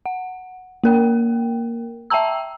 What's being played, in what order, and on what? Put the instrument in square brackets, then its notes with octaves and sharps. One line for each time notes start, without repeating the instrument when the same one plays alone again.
[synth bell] F#5
A#3 A#4 G5
E5 G5 A5 A#5 E6